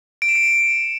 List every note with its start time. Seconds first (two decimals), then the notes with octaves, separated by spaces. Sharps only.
0.22 D7
0.29 E7
0.35 C#7